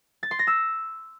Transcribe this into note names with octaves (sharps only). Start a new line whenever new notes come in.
A6
C6
A#6
E6